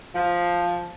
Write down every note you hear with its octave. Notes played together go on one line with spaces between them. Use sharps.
F3